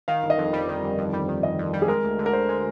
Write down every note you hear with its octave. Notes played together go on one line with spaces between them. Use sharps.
D#3 F5
G1
D#5
F2
G3
D#3
G1
F2
G3
D#3
G1 D#5
F2
G3
G#4
G#3 A#4
D2
D3
A#4
D2 C5
G#3